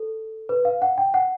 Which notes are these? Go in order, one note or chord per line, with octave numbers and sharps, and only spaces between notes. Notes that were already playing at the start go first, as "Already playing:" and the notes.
Already playing: A4
B4
F5
F#5
G5
F#5